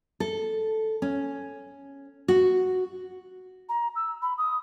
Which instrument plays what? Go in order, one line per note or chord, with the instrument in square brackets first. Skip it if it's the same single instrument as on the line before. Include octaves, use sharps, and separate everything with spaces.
[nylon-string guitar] A4
C#4
F#4
[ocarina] A#5
E6
B5
D#6